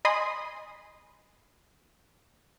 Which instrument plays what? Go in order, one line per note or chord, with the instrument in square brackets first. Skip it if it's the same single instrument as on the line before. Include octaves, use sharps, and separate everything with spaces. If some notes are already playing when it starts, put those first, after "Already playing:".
[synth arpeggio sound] D#5 G#5 B5 C6 D#6